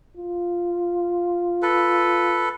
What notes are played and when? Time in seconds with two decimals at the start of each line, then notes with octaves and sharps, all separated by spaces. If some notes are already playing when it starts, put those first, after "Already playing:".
0.17 F4
1.62 A4 B4